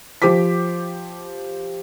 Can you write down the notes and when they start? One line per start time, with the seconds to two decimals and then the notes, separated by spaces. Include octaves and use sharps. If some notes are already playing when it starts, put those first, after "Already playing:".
0.22 F3 G4 C5 D6 B6